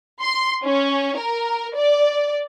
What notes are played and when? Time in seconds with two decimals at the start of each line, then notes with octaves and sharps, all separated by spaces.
0.21 C6
0.64 C#4
1.18 A#4
1.76 D5